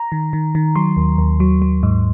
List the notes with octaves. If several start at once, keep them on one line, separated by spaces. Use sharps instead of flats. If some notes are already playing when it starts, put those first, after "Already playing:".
Already playing: A#5
D#3
D#3
D#3
F#3 C6
D#2
D#2
F#3
F#3
G#2